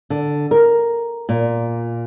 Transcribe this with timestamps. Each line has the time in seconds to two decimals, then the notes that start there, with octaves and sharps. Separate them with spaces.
0.10 D3
0.51 A#4
1.29 A#2